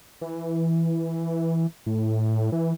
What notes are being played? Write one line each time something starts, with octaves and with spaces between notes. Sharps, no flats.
E3
A2
E3